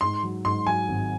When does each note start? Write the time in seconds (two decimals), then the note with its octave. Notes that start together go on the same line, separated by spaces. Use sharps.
0.01 G#2 C6
0.23 F#3
0.45 G#2 C6
0.67 F#3 G#5
0.88 G#1